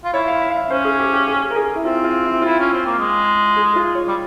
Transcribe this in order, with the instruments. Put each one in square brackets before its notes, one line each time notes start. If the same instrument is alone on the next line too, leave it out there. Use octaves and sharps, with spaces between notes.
[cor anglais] F4
[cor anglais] E4 [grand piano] C#5
[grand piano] F5
E5
F5
E5
[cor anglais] C#4 [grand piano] C5
[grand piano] G#4
G4
G4
G#4
A#4
G#4
E4
[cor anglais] C4 [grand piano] F4
[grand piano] F4
E4
[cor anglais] E4 [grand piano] F4
[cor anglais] C#4
C4
A#3
G#3
[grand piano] G#4
F4
C#5
[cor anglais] G3